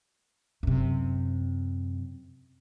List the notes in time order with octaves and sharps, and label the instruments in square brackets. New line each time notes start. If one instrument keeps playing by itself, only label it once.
[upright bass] F#2 C3